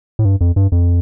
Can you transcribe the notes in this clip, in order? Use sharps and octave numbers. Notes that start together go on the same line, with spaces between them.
A2
G2
F2
G2
F2